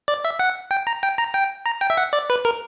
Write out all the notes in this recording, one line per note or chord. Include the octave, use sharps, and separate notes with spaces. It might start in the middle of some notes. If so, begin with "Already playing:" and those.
D5
E5
F#5
G5
A#5
G5
A#5
G5
A#5
G5
E5
F#5
D5
B4
A#4